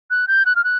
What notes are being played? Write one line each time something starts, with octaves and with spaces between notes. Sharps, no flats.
F#6
G6
F#6
F6
F#6